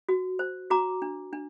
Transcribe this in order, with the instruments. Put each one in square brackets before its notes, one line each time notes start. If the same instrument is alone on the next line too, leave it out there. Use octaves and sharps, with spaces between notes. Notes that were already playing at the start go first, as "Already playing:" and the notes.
[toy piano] F#4
C5
F#4 A#5 D6
D4
D4